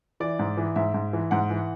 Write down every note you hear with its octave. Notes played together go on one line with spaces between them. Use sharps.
E3 D5
G#2
E3
G#2 E5
G#2
E3
G#2 F#5
E3